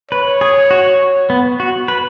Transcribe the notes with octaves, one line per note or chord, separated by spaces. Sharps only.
B4 C#5
G#4
F#4
B3
F#4
B4